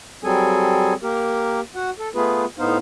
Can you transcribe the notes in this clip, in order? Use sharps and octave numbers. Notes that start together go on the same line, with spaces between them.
F#3 G3 C4 G#4 A4 G#5
A#3 G4 A#4
F#4 F#5
A4
A3 B3 F4 G#4 B4
A2 B3 D#4 C5 F5